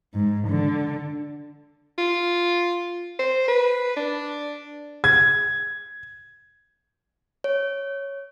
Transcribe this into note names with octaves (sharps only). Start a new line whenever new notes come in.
G#2
D3
F4
C5
B4
D4
G#6
C#5